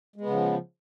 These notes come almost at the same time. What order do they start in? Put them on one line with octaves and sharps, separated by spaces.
G#3 B3 C#3 F3